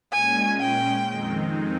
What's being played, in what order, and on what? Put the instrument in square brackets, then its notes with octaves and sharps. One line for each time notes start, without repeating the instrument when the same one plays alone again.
[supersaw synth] A#2 G#3 C#4 [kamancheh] G#5
[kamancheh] G5
[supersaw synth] F2 D#3 G#3 C4 D#4